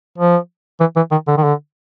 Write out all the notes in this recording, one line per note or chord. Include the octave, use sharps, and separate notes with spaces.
F3
E3
E3
D#3
D3
D#3
D3